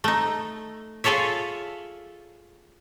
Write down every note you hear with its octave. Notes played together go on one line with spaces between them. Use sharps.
A3 D#4
F4 G#4 A4 C#5 E5